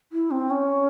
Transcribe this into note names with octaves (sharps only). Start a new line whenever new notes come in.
E4
C4
C#4